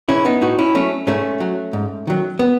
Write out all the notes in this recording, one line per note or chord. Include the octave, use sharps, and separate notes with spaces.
C#3 E3 C#4 E4
B3 D#4
A2 D#4 F#4
C#4 E4
F#3 A3 C#4
G#2 A3 C#4
F#3
G#2
D#3 F#3
B3